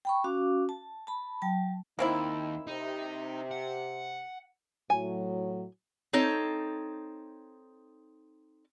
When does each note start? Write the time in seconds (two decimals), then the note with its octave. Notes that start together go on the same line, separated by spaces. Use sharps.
0.05 G5 B5 C#6
0.24 C#4 F#4 F5 D6
0.69 A5
1.07 A5 B5
1.42 F#3 G5 A5
1.99 D#2 A#3 C4 D#4 E4
2.67 C3 D#4
3.51 F#5
4.90 A2 F#3 G#5
6.13 C4 D#4 A4 C#5